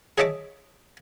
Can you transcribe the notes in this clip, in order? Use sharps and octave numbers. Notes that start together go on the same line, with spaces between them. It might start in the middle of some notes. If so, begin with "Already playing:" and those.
G#4 C#5 D#5 E5 A5 D6